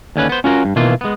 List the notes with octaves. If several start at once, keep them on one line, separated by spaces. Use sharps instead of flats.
D#2 D3 C#4 B4
B3 C5
C#4 F4 F#4 A#4
G2
B2 D#3 E3 A#3 F4
G#3 B3